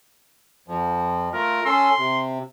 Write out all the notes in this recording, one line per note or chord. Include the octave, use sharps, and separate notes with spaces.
F2 F3
A3 F4 A#4
C#4 A4 C6 E6
C3